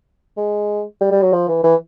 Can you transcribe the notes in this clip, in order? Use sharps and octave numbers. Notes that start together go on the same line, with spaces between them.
G#3
G3
G3
F#3
F3
E3
E3